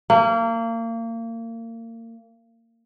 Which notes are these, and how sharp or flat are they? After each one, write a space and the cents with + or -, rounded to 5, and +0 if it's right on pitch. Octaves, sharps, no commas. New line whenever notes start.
A#3 -30